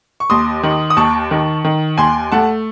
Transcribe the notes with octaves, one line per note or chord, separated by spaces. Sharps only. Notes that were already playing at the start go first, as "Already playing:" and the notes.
C#6
D#2 C6 D#6
D#3
D#6
D#2 A5 C#6
D#3
D#3
D#2 G#5 C6
A3 F#5 A5